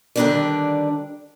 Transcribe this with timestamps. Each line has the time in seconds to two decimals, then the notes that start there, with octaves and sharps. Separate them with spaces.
0.16 D3 D#3 G3 D4 B4 D5